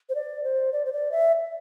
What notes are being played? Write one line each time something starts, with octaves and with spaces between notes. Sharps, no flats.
C5
D5
C5
D5
C5
D5
E5